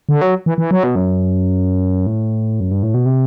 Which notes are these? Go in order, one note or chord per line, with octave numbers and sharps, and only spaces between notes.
D3
F#3
E3
E3
F#3
B2
F#2
A2
F#2
G2
A2
B2
C3